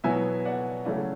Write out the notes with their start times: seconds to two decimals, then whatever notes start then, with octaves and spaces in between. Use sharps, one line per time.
0.04 B2 F#3 B3 E4 E5 G#5
0.45 D5 F#5
0.85 C#3 F#3 A3 C#4 E4 D5 F#5